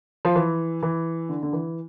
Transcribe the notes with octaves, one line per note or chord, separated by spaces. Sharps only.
F3
E3
E3
D3
D3
E3